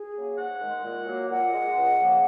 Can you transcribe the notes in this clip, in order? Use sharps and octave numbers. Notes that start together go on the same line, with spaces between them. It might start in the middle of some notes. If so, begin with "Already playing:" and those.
Already playing: G#4
C#3 F#3 A#3
G#2 F#5
D#3 G#3
A#2
F#3 A#3
A#2 F#5
G#3
C#2
C#3 F3 A#3